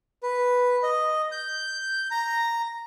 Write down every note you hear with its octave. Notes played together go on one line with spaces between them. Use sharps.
B4
D#5
G6
A#5